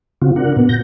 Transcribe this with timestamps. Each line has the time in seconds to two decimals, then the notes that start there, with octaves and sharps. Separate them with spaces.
0.22 C#3 C4 F4 F#4
0.36 D4 A#4 F#5
0.56 A#2 B3
0.69 G6 A#6